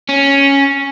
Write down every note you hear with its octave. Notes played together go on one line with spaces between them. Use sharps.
C#4